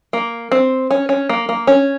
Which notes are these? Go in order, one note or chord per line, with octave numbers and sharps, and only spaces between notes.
A#3
C4
C#4
C#4
A#3
A#3
C#4